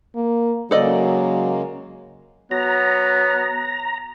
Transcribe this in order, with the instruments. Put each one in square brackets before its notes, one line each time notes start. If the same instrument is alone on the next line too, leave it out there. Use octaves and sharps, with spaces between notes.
[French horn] A#3
[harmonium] C#3 G#3 A#3 [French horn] F#3 [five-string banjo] A4 D5 D#5
[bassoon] F#3 [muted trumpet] B3 [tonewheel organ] A#5